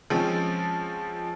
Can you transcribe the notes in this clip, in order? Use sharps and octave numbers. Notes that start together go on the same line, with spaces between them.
F3 G#3 C4 C#4